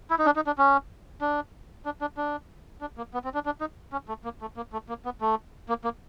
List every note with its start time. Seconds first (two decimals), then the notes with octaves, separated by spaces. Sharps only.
0.10 E4
0.19 D#4
0.26 D4
0.36 D#4
0.47 D4
0.58 C#4
1.21 D4
1.85 D4
2.01 D4
2.17 D4
2.81 D4
2.97 A#3
3.14 B3
3.24 C4
3.34 D4
3.46 D4
3.61 D#4
3.92 C#4
4.09 A3
4.24 A#3
4.41 A3
4.57 A#3
4.73 A3
4.89 A#3
5.05 B3
5.21 A3
5.69 A#3
5.84 A#3